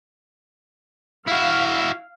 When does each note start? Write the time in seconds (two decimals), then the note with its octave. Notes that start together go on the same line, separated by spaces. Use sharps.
1.28 E4 F#4 F5